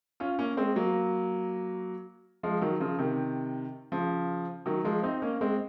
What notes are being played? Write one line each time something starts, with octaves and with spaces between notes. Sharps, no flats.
C#4 F4
A#3 C#4
G#3 C4
F#3 A#3
F3 G#3
D#3 F#3
C#3 F3
C3 D#3
C#3 F3
D#3 F#3
F3 G#3
C4 D#4
A#3 C#4
G#3 C4